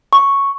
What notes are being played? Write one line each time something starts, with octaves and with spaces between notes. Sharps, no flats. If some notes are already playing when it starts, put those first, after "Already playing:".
C#6